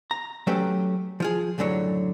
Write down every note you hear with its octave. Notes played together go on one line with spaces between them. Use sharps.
A#5
F#3 A3 C#4 G4 B4
F3 F4 G#4
C#2 F#2 A2 D3 F#3 C#5